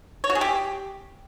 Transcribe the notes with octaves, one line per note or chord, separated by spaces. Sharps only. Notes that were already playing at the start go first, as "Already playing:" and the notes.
C#5
F#4
G#4
G4